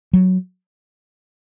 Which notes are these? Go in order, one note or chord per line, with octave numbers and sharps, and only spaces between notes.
F#3